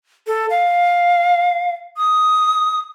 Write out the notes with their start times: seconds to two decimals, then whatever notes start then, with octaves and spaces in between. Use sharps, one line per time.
0.27 A4
0.50 F5
1.97 D#6